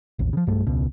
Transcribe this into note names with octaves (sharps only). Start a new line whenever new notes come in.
A1 D#2
C#3 F3
B1 G2 G3 A3
E1 C#2 B2